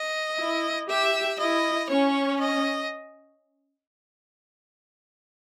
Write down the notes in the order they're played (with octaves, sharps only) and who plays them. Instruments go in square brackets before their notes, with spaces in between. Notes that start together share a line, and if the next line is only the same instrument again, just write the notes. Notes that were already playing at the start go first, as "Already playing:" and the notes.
Already playing: [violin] D#5
[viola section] E4
[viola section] G4 [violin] E5
[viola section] E4 [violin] D#5
[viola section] C#4 [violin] C#5
[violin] D#5